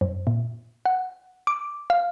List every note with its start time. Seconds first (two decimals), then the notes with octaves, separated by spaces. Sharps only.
0.01 F#2
0.27 A#2
0.85 F#5
1.47 D6
1.90 F5